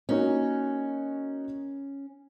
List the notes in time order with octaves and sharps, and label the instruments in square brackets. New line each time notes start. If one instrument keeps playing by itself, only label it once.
[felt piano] A#3 D#4 F#4 [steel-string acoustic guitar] C#4